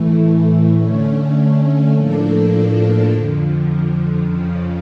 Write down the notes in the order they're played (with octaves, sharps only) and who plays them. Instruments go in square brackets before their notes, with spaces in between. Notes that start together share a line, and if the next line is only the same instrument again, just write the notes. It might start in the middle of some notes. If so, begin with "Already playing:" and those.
Already playing: [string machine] A2 E3 A3
D3 A3 C#4
A2 F3 A#3 D4 A4
F2 D3 F3
F2 C#3 F3